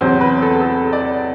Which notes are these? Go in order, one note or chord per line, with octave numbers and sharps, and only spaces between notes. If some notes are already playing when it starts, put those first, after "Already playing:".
E2 C3 F#3 C5
B4
A4
A4
D5